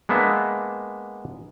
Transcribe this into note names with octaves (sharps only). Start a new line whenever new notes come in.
G#3 A#3 B3 D4 E5